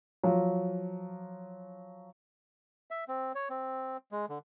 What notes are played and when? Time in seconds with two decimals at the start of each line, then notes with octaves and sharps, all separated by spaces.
0.23 F3 F#3
2.91 E5
3.08 C4
3.35 C#5
3.50 C4
4.12 G#3
4.29 D3